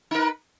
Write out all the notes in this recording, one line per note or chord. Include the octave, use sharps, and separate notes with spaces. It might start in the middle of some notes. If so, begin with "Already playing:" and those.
D#4 A#4 B4